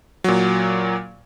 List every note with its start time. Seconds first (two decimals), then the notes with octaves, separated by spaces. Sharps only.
0.24 A#2 F#3